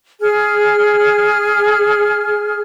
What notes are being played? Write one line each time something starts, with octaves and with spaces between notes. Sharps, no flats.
G#4 F6